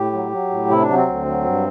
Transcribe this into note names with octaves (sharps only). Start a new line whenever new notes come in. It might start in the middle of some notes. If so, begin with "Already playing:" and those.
Already playing: A2 G4
F#3
F#3
A2
C3 E4
D4
F#3
C4
D2
F#3
G2